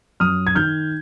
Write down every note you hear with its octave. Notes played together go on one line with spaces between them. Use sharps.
F#2 D#6 F6
G#6
D#3 F6 G6